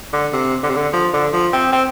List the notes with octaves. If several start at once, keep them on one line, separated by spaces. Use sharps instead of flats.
D3
C3
D3
C3
D3
F3
D3
F3
C4
C4